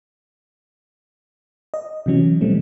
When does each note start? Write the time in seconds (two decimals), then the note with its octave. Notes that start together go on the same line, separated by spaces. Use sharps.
1.74 D#5
2.06 C3 E3 F#3 C#4
2.41 B2 E3 G3 A3 C4